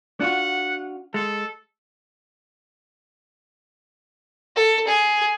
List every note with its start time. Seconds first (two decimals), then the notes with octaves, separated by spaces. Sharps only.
0.21 D4 F4 F#4 F#5
1.14 G#3 A4
4.56 A4
4.87 G#4